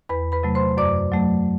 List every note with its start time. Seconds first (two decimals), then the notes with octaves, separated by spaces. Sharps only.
0.09 E2 B4 B5
0.32 B4 B5
0.43 C3 F#3 A3
0.55 C5 C6
0.77 F#2 D5 D6
1.12 F#3 A3